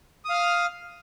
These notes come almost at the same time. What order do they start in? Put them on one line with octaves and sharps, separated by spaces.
D#6 F5 F6